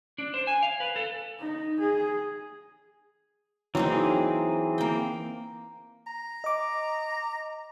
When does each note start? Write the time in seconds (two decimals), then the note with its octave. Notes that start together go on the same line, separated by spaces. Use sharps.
0.18 D4
0.34 C5
0.47 G#5
0.63 F5
0.80 B4
0.96 A4
1.40 D#4
1.80 G#4
3.75 E3 F#3 A#3 C4 D#4 G#4
4.78 A#3 G5
6.07 A#5
6.44 D#5 D6